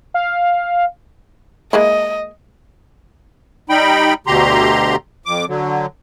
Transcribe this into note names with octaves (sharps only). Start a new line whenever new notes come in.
F5
G#3 A#3 E4 D#5
G3 D#4 G5 B5
D2 B2 D3 G4 A#5 C6
F2 D6
D3 F#3